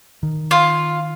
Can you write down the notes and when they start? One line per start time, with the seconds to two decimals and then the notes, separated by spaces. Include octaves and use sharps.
0.23 D#3
0.51 F4